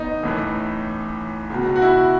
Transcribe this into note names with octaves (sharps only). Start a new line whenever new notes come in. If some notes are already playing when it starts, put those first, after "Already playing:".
Already playing: A1 B3 D#4
A1 A2 E3
C#2 B2
F#4
E4